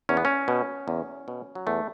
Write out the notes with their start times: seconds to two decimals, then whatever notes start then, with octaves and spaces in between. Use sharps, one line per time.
0.09 E2 C#4
0.17 B3
0.25 C#4
0.48 B2
0.88 E2
1.28 B2
1.55 F#3
1.67 E2 A3